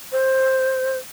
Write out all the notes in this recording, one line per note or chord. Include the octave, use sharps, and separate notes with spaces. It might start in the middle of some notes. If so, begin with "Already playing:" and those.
C5